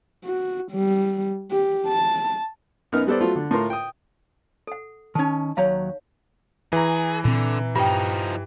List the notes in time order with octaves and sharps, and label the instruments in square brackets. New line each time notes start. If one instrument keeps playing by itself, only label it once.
[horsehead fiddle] F#4
G3
G4
A5
[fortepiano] F#2 B3 D#4 A#4 F6
G3 B3 A4 C5 D5
F#3 A3 F4
D3
A2 F4 A#4 C6
G5 D#6
[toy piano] A4 F#5
[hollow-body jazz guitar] D#3 C#4 [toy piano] D#4 A5
[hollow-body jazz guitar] D#2 F#3 A#5 [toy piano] C#5 F5
[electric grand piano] E3 A#5 [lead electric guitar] G#4
[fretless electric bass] A#2 C4 [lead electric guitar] D3
[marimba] G2 G5 [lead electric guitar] F3 D#4